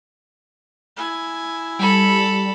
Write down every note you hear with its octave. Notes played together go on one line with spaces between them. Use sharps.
E4 G#5
G3 A4 B5